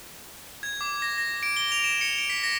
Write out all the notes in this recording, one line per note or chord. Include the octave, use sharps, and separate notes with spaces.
G#6
D6
A#6
A#6
D7
G7
F7
E7
C#7
D7
B6
A#6